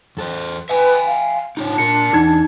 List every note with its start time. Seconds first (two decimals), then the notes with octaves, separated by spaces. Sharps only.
0.17 E2 A4 C5
0.69 B4 E5 G5 G#5
1.06 F5
1.57 D4 D#4 F4 C#5
1.78 A#2 A#4 C#7
2.13 E2 D#4 G#6